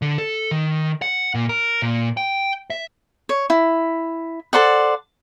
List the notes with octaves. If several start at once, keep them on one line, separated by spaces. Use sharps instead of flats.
D3
A4
D#3
F#5
A#2
A#4
A#2
G5
E5
C#5
E4
A4 C5 D5 F#5